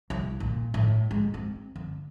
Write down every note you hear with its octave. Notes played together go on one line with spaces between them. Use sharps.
C2
A#2
A2
G#3
C4
D3